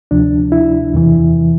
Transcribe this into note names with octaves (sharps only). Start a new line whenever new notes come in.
D2 C3 F3 D4
E4
E2 C3 E3